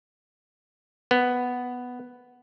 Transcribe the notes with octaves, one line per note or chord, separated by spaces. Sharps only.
B3